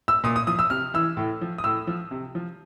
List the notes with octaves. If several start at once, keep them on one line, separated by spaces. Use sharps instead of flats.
E6
A#2 D#6
D#6
F3 D#6
E6
C3 F6
E3 E6
A2
F3
D#6
A2 E6
F3
C3
F3